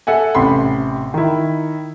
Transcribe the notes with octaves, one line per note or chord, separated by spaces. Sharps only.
A4 E5 F#5 G#5
A1 C3 B5 C6
D#3 E4